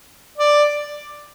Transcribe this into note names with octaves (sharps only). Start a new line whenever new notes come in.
D5